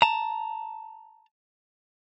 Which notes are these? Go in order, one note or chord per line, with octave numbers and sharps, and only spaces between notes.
A5 A#5